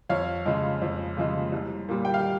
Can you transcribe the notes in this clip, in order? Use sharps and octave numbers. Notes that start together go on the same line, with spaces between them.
F2 C#5 F5
C#3 F3 G#3
F2
C#3 F3 G#3
C2
A#2 G3
G5
F5